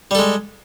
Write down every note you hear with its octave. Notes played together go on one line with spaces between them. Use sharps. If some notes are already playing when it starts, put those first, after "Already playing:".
G3 G#3 A4